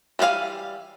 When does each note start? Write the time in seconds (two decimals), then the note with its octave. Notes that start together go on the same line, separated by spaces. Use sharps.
0.19 E3 G3 B3 F5 G#5